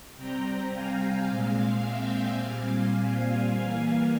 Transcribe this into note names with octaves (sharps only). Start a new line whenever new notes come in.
C3 G3 C4 G5 A#5
F5 G#5
A#2 G#3 C4
E5 G5
A#2 G3 C4 F5 G#5
E3 G3 A#3